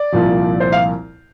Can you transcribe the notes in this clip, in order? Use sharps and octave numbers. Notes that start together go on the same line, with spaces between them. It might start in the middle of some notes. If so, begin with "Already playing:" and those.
Already playing: D5
C2 A#2 F3
C5
F5